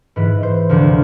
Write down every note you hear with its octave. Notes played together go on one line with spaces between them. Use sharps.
G#2 E3 B4
C5
D2 C3 F3